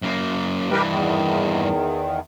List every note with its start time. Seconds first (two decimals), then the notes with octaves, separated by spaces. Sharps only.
0.02 F#2 A#3
0.71 G2 E3 G4 A#4 B4
0.89 E2 D#3